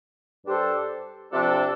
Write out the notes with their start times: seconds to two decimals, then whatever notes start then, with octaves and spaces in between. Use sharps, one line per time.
0.44 G2 G3 D4 A4 C5
1.31 C3 F3 D4 A4